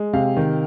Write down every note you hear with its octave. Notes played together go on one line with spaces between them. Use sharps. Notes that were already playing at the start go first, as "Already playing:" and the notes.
Already playing: G#3
C3 F5
D#3